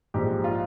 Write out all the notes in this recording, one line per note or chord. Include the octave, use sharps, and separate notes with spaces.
A#1 G#2 F3 G4
F4